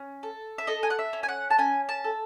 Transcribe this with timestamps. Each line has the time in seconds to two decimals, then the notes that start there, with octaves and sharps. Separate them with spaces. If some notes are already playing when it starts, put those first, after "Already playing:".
Already playing: C#4
0.23 A4
0.58 E5
0.67 A4 D#5
0.83 G#5
0.90 F#5
0.99 E5
1.13 C#4
1.23 G#5
1.29 F#5
1.50 A5
1.58 C#4 G#5
1.89 A5
2.04 A4